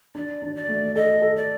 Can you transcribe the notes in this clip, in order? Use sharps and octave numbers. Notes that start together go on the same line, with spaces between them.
D4 D5
D4
D5
A3
A4 D#5
A4
D5